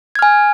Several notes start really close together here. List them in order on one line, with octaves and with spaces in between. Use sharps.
G#6 F6 G#5